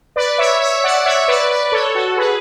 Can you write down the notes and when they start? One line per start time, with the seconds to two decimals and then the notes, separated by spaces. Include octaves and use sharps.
0.16 B4 D5
0.38 C#5 E5
0.60 C#5 E5
0.84 D5 F#5
1.05 C#5 E5
1.28 B4 D5
1.50 B4 D5
1.72 A4 C#5
1.95 F#4 A4
2.17 G#4 B4